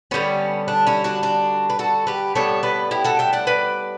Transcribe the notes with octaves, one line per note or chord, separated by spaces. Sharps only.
D3 G3 B3 C#4
D4
C#4 E4
D4 F#4
D4 F#4
B4
F#4 A4
G4 B4
A2 G3 B3 A4 C#5
B4 D5
E4 G4
F#4 A4
E5 G5
D5 F#5
B4 D5